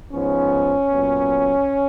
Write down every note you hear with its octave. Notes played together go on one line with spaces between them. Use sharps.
G#2 F3 B3 C#4
A#2 F#3 B3